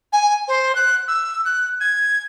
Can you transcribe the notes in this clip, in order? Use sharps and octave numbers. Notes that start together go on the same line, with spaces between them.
G#5
C5
F#6
E6
F#6
G#6